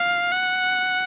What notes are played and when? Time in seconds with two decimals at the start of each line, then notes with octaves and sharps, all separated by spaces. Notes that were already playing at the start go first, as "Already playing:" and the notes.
Already playing: F5
0.32 F#5